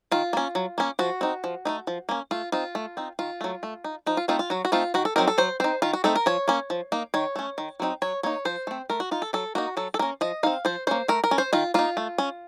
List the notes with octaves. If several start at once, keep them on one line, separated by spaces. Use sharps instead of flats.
D#3 F4
A#3 C#4
F#3
A#3 C#4
F3 F#4
C4 D#4
F3
A3 C4 D#4
F3
A#3 C#4
A3 F4
C4 D#4 F4
A3
C4 D#4
D#3 F4
F#3 A3
A3
D#4
F3 D#4
F4
A3 C4 D#4 F4
F4
F#3 F#4
F#4
A3 C4 D#4 F4
D#3 F#4
A4
F#3 C4 D#4 A#4
A4
F#3 C5
C4 D#4 C5
D#3 F4
F#4
A3 C4 D#4 A4
A#4
F3 C#5
A#3 C#4
F3
A#3 D#4
D#3 C#5
A3 C#4
D#3
F#3 C4 D#4
F#3 C#5
A#3 D#4 C#5
F3 C5
A3 C4
A3 A#4
F#4
D#4 F4
A4
F#3 A4
A#3 D#4 F#4
F#3 A4
A4
A#3 C#4 A#4
F3 D#5
C4 D#4 F5
F3 C5
A#3 C#4 C5
A3 A#4
A#4
C#4
C5
D#3 F4
A#3 D#4 F4
A3
C#4